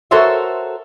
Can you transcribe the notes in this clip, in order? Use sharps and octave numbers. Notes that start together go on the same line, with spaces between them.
F#4 A4 A#4 C5 C#5 E5